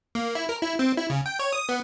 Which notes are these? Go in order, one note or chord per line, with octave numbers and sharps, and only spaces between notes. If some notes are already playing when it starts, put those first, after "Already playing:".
A#3
E4
A#4
E4
C4
E4
C#3
G5
C#5
D#6
B3